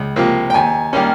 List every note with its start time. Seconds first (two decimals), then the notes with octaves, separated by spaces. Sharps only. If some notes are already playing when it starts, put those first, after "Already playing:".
Already playing: C#2
0.16 C3 F3 A#3
0.50 G5
0.54 D#2 G#5
0.93 D#3 G3 A#3 C#4